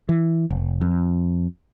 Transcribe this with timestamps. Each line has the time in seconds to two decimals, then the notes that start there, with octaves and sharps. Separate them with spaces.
0.09 E3
0.50 F1
0.81 F2